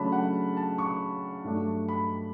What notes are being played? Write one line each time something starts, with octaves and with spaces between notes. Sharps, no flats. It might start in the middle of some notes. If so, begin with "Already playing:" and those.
Already playing: C#3 F#3 A3 D4 A5 B5
F#5
A5
C#6
G2 F#3 A3 D4
B5